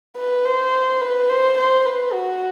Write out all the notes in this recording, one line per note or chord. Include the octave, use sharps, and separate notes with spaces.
B4
C5
B4
C5
C5
B4
F#4